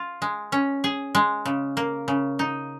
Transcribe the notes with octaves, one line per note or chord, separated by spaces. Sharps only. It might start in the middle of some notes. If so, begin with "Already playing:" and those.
Already playing: F4
G#3
C#4
G#4
G#3
C#3
A#3
C#3
D#4